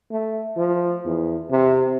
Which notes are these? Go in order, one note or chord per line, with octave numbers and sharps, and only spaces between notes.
A3
F3
E2
C3